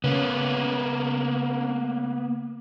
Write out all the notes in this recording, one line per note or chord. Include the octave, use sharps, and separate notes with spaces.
C#3 A#3 B3